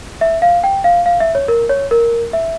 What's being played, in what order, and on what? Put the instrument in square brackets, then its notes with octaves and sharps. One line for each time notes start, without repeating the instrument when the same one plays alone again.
[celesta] E5
F5
G5
F5
F5
E5
C#5
A#4
C#5
A#4
E5